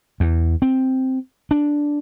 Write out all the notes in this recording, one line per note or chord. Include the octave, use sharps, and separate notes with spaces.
E2
C4
D4